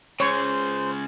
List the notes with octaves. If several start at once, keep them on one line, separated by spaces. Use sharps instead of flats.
C#3 G#3 C5 C#5 C#6